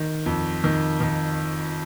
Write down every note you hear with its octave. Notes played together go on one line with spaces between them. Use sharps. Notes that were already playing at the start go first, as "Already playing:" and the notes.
Already playing: D#3
F2
D#3
D#3